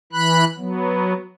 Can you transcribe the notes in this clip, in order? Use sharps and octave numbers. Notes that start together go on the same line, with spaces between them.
E3 B5 F#6
F#3 B3